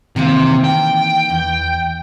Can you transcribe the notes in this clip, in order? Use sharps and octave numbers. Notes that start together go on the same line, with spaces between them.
C3 D#3 E3 A#3
G5
E2